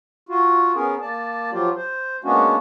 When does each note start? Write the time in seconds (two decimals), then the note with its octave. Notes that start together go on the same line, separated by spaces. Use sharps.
0.29 F4 F#4
0.75 B3 C#4 G#4 A#4
1.01 A#3 D5 A5
1.52 F3 F#3 F4 G4
1.76 C5
2.24 G#3 A#3 B3 C#4 D4 F#4